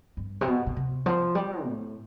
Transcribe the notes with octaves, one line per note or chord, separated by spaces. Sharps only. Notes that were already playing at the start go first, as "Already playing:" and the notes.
G2
C3
B2
B2
C3
F3
G3
A2